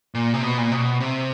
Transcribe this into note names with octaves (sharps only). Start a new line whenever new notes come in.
A#2
C3
B2
A#2
B2
C3